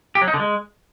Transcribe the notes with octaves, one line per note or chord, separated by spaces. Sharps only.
G4
F#3
D#4
D3
G#3